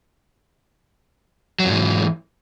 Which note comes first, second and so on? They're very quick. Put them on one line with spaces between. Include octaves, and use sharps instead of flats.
F#3 F2 G#2 E3